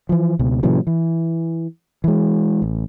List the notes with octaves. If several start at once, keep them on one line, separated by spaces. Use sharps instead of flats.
E3 F3
C#2 B2
A#2 C#3 E3 F#3
E3
E3 G#3
A1